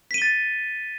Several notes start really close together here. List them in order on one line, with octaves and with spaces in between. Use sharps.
B6 D#7 G7 A6